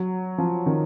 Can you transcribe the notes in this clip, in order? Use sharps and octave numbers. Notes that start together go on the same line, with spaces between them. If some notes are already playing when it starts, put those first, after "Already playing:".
Already playing: F#3
F3
D#3